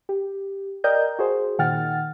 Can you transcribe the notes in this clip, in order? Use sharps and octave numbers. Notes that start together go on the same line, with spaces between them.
G4
A#4 D5 D#5 G5 A#5 G6
F#4 G#4 C5
A#2 D#3 F#5 G5 F6 A6